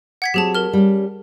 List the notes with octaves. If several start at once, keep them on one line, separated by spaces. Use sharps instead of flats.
F#5 G#6 B6
F#3 C4 G4 G#4 A5
A#4 F6
G3 C#4